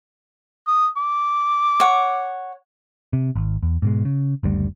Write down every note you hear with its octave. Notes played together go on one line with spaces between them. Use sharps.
D#6
D6
C#5 F#5
C3
G#1
E2
G#2 B2 G#3
C#3
F#1 D2 G3